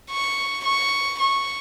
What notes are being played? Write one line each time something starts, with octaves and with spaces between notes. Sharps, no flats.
C#6
C#6
C#6